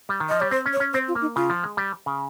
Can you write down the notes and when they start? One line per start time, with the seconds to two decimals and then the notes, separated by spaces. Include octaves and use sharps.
0.09 G3
0.20 D#3
0.29 F3 D#5
0.41 G3 C#5
0.51 C4 C5
0.66 C#4
0.73 C#5
0.80 C#4
0.93 C4 C5
1.08 F4
1.15 A#3
1.21 D#4
1.36 C#3 F4
1.50 F3
1.64 G#3
1.77 G3
2.06 C#3